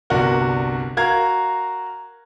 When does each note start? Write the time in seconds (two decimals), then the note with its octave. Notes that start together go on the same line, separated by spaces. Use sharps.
0.10 G1 C2 D4 F#4 A#4
0.97 F#4 A#4 F5 A#5 G#6